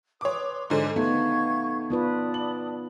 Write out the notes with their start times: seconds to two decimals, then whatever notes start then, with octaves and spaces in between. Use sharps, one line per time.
0.21 B4 C#5 C6 D6 D#6
0.70 G#2 D3 C5 D#5 G#5 C6
0.96 A3 B3 D#4 F5 C#6 G#6
1.90 B3 F4 B4 D5 A5 D#6
2.34 F#7